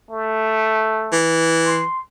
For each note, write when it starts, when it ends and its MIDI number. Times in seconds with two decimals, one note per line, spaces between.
0.11 1.18 57
1.13 1.84 52
1.64 1.99 84